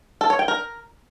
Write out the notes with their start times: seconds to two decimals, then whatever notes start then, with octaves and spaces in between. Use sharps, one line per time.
0.21 A4
0.30 C#5
0.39 G5
0.48 A#4